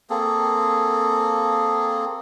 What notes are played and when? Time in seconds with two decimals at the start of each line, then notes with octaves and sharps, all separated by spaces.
0.10 A#3 C4 G#4 A4